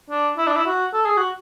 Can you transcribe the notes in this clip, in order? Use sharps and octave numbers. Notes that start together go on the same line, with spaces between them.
D4
E4
D4
E4
F#4
A4
G#4
F#4